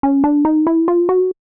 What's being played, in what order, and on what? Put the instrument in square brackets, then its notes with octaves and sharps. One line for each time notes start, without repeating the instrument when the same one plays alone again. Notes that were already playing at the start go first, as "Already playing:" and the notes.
[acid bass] C#4
D4
D#4
E4
F4
F#4